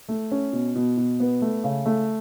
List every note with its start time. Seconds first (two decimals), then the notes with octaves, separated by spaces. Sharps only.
0.09 A3
0.31 C#4
0.53 B2
0.75 B2
0.97 B2
1.20 B3
1.42 A3
1.64 C#3
1.86 A3